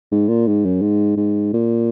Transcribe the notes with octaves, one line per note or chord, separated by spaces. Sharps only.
G#2
A#2
G#2
F#2
G#2
G#2
A#2